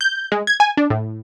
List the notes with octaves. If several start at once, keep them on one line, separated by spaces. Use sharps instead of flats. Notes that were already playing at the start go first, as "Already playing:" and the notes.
G6
G#3
G#6
G#5
D4
A2